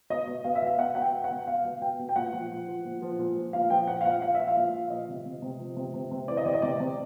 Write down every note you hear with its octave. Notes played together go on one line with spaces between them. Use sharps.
B2 D#5
B2
B2 F5
E5
B2 F5
B2 F#5
B2 F#5
G5
B2
F#5
B2
B2 F5
B2
B2 G5
B2
G5
A#2 F#5
F3
F3
F3
A#2
F3
A#2
F3
A#2 F5
F3 G5
A#2 F#5
F5
A#2 F#5
F3 F5
F3 E5
F5
A#2
F3
F3 D#5
C3
C3
C3
F3
C3
C3
C3
E3 D5
D#5
C3 D5
D#5
C3 D5
C3